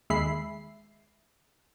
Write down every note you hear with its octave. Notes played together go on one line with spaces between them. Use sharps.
D#2 G#3 E5 B5 C7